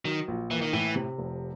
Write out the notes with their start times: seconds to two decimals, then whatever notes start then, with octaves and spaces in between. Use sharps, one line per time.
0.05 D#3 F#3
0.28 A#1
0.51 E3 A#3
0.61 D#3
0.73 A2 E3
0.96 C3
1.18 F1